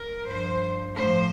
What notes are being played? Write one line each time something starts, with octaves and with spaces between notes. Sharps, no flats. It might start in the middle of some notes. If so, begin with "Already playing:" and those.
Already playing: A#4
G2 F3 C5
A2 F3 C5